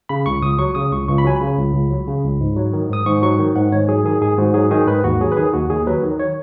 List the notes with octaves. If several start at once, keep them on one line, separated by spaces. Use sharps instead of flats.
C#3 B5
C#2 C#6
C#2 D#6
F#3 C#6
C#3 D#6
C#2 C#6
C#2 C#6
B5
F#3 G#5
C#3 B5
C#2
C#2
F#3
C#3
C#2
G#2
F#3
D#3
G#2 D#6
G#2 C#6
F#3 C#6
D#3
G#2 F#5
G#2 C#5
F#3 G#4
D#3 G#4
G#2 G#4
G#2 F#4
F#3 G#4
D#3 G#4
G#2 B4
D#2 F#4
F#3 G#4
B4
D#3 G#4
D#2 F#4
D#2 G#4
F#3 B4
D#3
C#5